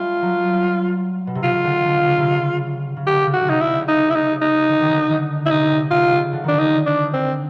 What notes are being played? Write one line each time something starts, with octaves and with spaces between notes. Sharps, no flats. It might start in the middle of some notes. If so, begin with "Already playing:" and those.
Already playing: G3 A3 F4
F#3
B2
C3
C#3 F4
C#3
D3
D3
C#3
C3
C#3
C#3
D3 G4
C#3
F#4
C#3
C3 D#4
E4
C#3
D#4
E4
D#4
D#4
D3
D#3
D3
D3
E4
C3 D#4
C3
C3 F4
C#3
D3
D#3 D4
D3
D#4
D4
C4